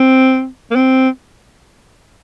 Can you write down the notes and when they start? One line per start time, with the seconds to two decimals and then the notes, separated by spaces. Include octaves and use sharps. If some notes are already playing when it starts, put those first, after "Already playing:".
Already playing: C4
0.71 A#3
0.75 C4